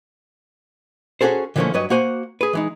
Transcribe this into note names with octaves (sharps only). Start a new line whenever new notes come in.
C#4 D4 F#4 G#4 A4 C5
D3 E3 F3 A3 A#3 C#4
G2 F#3 B4 C#5 D#5
A#3 F#4 C5 G#5
G#4 B4
E3 G#3 D#4